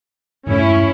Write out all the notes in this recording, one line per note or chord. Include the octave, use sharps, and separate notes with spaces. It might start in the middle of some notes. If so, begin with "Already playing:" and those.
E1 G2 A3 C#4 E4